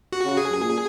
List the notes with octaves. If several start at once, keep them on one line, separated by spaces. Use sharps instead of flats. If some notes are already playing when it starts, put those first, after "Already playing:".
F#4
C#3
G#4
F#2
A#2